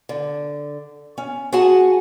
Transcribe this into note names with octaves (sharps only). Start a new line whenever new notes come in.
D3
C#4
F#4 G#4 F#5 G#5 A5